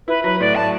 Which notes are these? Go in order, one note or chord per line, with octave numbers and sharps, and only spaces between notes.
E4 B4
F#3 B4
A2 D5
A2 A5